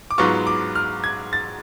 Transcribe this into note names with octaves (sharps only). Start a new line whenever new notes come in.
D6
G#2 F#3 B3 F4 C#6
D6
F6
G#6
A6